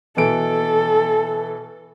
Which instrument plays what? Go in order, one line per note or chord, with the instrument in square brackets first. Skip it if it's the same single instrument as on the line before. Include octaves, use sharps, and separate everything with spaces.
[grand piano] B2 E3 D7 [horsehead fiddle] A4